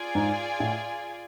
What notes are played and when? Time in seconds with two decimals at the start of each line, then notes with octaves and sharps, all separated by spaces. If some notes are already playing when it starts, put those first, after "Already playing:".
Already playing: F4 G#4 D5 G#5
0.15 G#2
0.60 A2